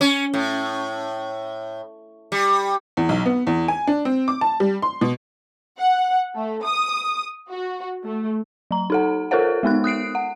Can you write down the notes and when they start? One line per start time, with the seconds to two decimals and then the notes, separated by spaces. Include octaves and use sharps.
0.01 C#4
0.34 A2
2.32 G3
2.97 E2
3.09 B1
3.26 B3
3.47 E2
3.68 G#5
3.87 D4
4.05 C4
4.28 D6
4.41 A5
4.60 G3
4.82 C6
5.01 B2
5.79 F#5
6.35 A3
6.63 D#6
7.50 F#4
8.04 A3
8.71 F#3 A#5
8.90 D#4 A4 F#5
9.31 F4 A4 A#4 C5 C#5 F#5
9.63 G#3 B3 D#4 F#6
9.84 D#6 F#6 C7 D7
10.15 F#5